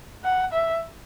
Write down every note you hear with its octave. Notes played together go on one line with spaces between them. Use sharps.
F#5
E5